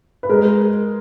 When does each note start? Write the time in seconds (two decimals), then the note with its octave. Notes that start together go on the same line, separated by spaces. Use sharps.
0.23 B4
0.29 G#3 A#4